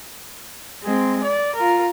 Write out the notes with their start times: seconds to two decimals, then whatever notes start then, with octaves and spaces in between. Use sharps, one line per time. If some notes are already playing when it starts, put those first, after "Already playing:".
0.83 G#3 C4
1.24 D5
1.55 F4 A#4